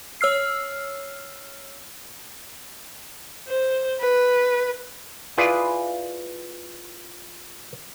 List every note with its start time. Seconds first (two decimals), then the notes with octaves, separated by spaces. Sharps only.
0.21 C#5 E6 F6 C7
3.48 C5
4.00 B4
5.37 E4 F4 G#4 B4 D5